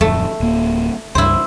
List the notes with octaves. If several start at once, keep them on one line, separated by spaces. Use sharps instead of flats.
D1 F2 A3
D1 A#3
C#2 G2 E4 C5